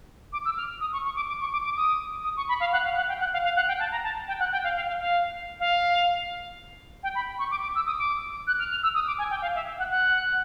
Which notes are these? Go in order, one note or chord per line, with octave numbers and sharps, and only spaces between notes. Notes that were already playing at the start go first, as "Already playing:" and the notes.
D6
E6
F6
D#6
C#6
C#6
D6
D6
C#6
D6
D6
D#6
D#6
C#6
B5
F5
F#5
F5
F#5
G5
F#5
F5
F5
F#5
G5
A5
A#5
A5
G5
F#5
G5
F5
F5
F5
F5
F5
G5
B5
C#6
D6
D6
E6
D#6
D6
F#6
F6
F6
E6
D#6
D6
G#5
G5
F5
E5
F#5
F#5